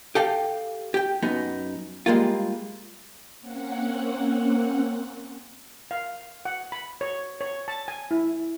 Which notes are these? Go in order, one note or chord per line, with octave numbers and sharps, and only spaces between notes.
G4 A4 F5 G5
G4 G5
F#2 B3 D#4
G3 G#3 A#3 F4
A#3 C4 C#4 F#5
F5
F#5
B5
C#5
C#5
A5
G#5
E4